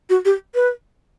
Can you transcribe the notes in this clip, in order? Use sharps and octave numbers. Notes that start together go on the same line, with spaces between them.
F#4
G4
B4